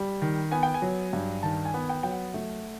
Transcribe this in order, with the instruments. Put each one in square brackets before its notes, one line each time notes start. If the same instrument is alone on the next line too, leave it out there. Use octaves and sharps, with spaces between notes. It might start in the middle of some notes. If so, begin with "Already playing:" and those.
Already playing: [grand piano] G3
D#3
B3 G#5
G5
G#5
F#3
G2
D#3 A5
G#5
B3
G5
F#3 G5
F#5
A3